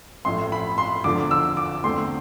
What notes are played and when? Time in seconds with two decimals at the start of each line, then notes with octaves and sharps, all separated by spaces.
0.25 A1 A2 F3 C6
0.52 B5
0.78 C6
1.04 E2 D3 F3 D6
1.31 E6
1.57 D6
1.84 E2 D3 A3 C4 C6